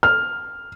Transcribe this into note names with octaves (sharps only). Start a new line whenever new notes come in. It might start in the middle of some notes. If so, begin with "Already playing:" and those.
F6